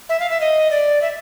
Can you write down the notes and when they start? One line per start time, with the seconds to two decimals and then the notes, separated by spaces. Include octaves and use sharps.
0.09 E5
0.20 F5
0.30 E5
0.40 D#5
0.71 D5
1.02 E5